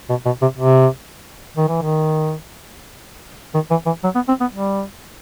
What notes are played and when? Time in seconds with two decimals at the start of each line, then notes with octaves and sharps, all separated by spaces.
0.10 B2
0.26 B2
0.42 C3
0.58 C3
1.57 D#3
1.69 E3
1.82 D#3
3.55 D#3
3.71 E3
3.86 E3
4.04 F#3
4.15 B3
4.28 C4
4.41 B3
4.53 G3